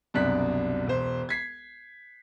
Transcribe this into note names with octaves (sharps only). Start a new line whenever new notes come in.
C2 F#2 B2 D4 F#6 B6
E1 C5
G#6 B6 C7